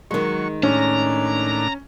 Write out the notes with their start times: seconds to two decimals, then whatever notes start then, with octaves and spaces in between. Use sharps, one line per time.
0.11 D#3 F#3 G#3 C#6
0.63 A2 C#4 D4 A#5